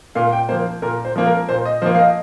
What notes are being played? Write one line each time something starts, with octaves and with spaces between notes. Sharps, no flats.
A#2 F5
G5
F3 A#3 C5
A#2 A#4
C5
F3 A#3
A#4
A#2 C5
D#5
F3 A#3 C5
F5
D#5